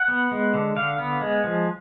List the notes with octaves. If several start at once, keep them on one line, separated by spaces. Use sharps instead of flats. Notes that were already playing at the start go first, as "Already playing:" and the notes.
Already playing: F#5
B3
G#3
D3
D3 F5
B3
G#3
F3